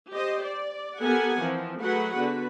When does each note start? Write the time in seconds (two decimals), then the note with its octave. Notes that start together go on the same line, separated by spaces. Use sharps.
0.10 G4 C5 D#5
0.43 D5
1.01 B3 G4 A4 A#4 F#5 G#5
1.40 E3 F3 C4
1.81 F#3 A3 F#4 G#4 B4 F#5
2.14 D3 B3 F#4 B4